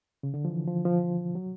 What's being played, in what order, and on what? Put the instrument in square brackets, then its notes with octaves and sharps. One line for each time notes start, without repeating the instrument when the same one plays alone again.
[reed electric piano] C#3
D3
F3
E3
F3
F3
F#3